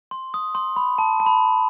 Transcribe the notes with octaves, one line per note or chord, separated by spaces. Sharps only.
C6
D#6
C6
B5
A5
A5
B5